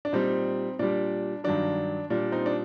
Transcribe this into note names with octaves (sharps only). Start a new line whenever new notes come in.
D4
A#2 G3 C4 D#4
A#2 G3 D4
G2 D#3 F#3 D4
A#2 G3 D4
C4 D#4
D4